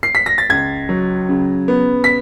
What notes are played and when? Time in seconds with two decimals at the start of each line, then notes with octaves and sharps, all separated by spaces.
0.03 C7
0.15 B6
0.26 A#6
0.38 A6
0.49 C#2 G#6
0.89 F#3
1.29 C#3
1.68 B3
2.04 B6